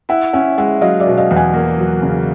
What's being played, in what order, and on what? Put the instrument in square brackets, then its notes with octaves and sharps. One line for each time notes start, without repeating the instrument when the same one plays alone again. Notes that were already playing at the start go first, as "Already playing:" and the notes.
[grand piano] E4 [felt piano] E5 F#5
[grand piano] C#4 [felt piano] E5 F#5
[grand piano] G#3 [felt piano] E5 F#5
[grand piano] F#3 [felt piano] D#5 F5
[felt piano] D5 E5
[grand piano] B2
[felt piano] D#5 F5
[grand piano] E2
[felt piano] F#5 G#5
[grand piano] A#3
F#3
C#3